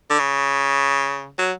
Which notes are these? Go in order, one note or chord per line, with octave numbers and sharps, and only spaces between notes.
D3
C#3
F#3